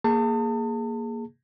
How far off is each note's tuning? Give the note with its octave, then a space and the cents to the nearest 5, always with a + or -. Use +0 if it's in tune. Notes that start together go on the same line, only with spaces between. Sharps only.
A#3 +0 G#4 +0 A5 +35